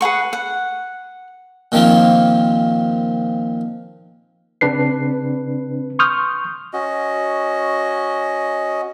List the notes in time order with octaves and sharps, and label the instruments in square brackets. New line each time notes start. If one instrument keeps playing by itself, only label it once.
[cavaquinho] G#4 B4 F#5 C#6
F#5
[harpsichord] A#2 D#3 F3 C4 F4
[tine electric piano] C#3 C4 D4 B4 C7
C6 C#6 D#6 F6 G6
[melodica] C#4 F#4 D#5